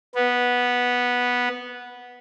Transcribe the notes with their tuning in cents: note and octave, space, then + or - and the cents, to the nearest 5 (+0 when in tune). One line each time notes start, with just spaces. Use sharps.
B3 -10